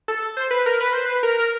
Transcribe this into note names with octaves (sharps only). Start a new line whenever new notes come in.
A4
C5
B4
A#4
B4
C5
B4
A#4
A#4